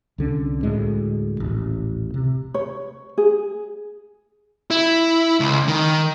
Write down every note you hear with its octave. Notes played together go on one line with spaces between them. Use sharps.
C2 D3 C#4
D2 A2 G#3
D#1 A1
C3
C#5
G#4
E4
C#2
D#3